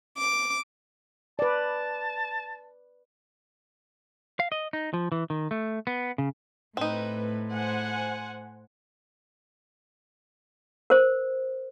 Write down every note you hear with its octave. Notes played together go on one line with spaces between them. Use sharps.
D6
B4 D5 A5
F5
D#5
D#4
F3
E3
D#3
A3
B3
C#3
A2 C4 D#4 B4
C5 F#5 G#5
A#4 C5